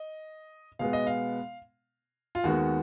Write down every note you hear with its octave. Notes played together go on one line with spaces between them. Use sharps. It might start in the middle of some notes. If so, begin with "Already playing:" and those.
Already playing: D#5
B2 G#3 B3 F5
D#5
F5
F4
D#2 D#3 G#3 B3 F#4